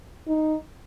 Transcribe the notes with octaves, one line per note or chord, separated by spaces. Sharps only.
D#4